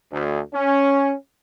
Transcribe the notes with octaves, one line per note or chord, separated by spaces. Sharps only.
D2
C#4